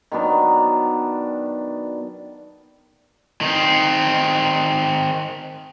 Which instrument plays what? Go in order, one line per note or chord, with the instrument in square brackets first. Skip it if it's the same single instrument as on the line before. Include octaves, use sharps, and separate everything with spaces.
[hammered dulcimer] D#3 F#3 B3 D4
[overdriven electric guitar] D#3 C4